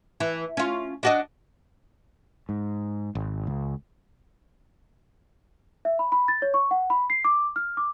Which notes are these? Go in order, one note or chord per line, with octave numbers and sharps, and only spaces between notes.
E3
C#4 F4
D4 F#4 D#5
G#2
G#1
C#2
E5
B5
B5
A6
C#5
C#6
F#5
B5
C7
D6
F6
D6